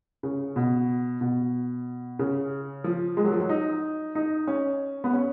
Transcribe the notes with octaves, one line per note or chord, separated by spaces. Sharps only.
C#3
B2
B2
C#3
F3
G#3
F#3
F3
F#3
D#4
D#4
C#4
B3
C#4